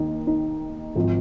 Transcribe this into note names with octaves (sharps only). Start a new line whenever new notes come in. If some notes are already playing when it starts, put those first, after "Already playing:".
Already playing: D#2 D#3 D#4
D#4
G#1 F3